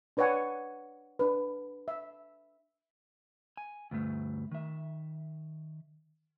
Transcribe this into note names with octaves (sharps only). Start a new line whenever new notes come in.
D4 B4 C#5 D5 F#5 G#5
D4 B4
E5
G#5
D2 G2 A3
D#3 E5